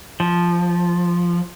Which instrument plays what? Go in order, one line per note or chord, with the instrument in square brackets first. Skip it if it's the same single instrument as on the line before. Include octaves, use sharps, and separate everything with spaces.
[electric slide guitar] F3